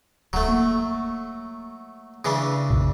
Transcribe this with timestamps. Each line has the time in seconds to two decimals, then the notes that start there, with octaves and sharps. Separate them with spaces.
0.33 D1 F#3 A3
0.48 A#3
2.25 C#3 E3 D4
2.70 B1 F#2 A#2